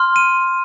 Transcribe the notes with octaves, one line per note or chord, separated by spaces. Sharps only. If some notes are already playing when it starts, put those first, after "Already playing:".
Already playing: C6 F6
D#7